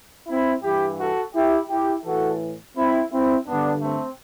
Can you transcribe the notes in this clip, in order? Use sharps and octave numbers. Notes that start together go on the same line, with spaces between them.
C4 E4
G2 E3 E4 G4
F#4 A4
E4 G4
E4 G4
A2 E3 F#4 A4
C4 E4
C4 E4
G2 D3 B3 D4
A3 C4